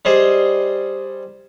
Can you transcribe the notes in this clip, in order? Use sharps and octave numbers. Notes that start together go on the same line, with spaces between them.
G3 G#4 C5 D#5